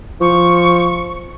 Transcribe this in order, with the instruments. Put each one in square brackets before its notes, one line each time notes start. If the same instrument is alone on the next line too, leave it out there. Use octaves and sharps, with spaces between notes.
[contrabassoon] F3 [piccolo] C#6